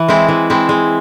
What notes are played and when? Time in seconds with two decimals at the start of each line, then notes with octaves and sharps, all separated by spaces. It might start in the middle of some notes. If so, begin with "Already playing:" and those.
Already playing: E3
0.08 G#3 C4 E4
0.28 E3
0.50 G#3 C4 E4
0.69 G#3